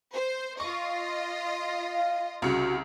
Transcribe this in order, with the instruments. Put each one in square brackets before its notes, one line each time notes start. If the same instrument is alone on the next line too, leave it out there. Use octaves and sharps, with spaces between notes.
[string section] C5
[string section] F4 D#5 [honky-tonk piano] C#6
[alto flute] F5
[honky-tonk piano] C2 C#3 C#7 [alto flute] F#4